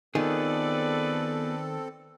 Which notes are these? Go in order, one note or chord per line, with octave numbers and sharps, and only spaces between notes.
D#3 B3 C4 F4 G#4 A4 B4 D5